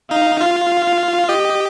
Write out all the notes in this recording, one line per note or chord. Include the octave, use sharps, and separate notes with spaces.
D#4 F5
F4 F5
G4 D#5